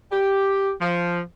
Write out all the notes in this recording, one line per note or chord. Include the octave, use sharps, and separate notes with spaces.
G4
F3